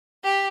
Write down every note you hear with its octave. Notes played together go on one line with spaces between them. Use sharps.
G4